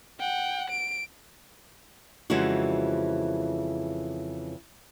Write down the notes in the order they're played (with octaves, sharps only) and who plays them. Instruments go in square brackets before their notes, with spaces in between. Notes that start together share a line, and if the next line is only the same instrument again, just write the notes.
[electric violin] F#5 G5
D7
[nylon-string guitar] F2 C#3 E3 G#3 C4 F#4